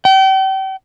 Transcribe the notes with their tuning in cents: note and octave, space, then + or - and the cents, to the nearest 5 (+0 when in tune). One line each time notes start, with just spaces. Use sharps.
G5 -35